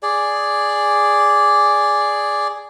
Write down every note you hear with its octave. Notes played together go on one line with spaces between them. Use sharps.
G#4 D5